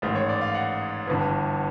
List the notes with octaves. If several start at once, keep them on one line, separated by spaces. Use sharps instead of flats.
A1 G#2 D#3
C#5
D5
F5
F#5
G1 G2 E3